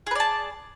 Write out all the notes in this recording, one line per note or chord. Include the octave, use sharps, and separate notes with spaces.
G#4 B4 D5 A5